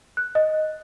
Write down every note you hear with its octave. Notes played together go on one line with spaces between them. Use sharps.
F#6
D#5